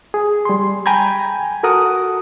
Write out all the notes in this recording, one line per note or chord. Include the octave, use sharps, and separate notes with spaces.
G#4
G3 C6
G5 G#5 A#5 B5 G#6
F#4 A4 A#4 F#5 D#6